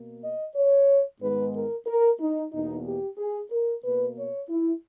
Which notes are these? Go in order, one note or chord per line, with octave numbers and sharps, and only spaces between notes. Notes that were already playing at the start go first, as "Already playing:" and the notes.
Already playing: B2 A#3
D#5
C#5
G#2 D#3 G#3 B3 B4
A#4
A#4
D#4
E2 B2 A#3 D#4
G4
G#4
A#4
B2 A#3 B4
C#5
E4